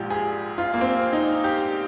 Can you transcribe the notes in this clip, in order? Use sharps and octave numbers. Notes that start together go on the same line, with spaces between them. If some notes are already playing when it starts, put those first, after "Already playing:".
Already playing: A#1 G#2 F3 G4
G#4
F4
A#3
C4
D#4
G4